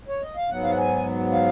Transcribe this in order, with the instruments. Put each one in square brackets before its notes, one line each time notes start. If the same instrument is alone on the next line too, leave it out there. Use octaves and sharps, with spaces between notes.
[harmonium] C#5
D#5
F5
G#2 F#3 B3 F#5
F5
F#5
G#5
F5